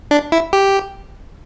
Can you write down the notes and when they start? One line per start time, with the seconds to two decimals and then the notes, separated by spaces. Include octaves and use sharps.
0.11 D4
0.32 E4
0.53 G4